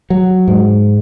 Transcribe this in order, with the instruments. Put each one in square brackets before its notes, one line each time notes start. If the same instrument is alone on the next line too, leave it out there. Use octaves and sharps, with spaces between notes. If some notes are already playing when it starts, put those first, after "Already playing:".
[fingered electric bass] F#3
G#2